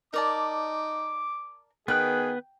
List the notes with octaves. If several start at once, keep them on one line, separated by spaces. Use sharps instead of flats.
D#4 A#4 D5 A5 D6
D#3 B3 G#4 B4 G5 F#6